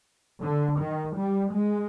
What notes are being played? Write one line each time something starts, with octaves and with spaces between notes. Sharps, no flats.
D3
D#3
G3
G#3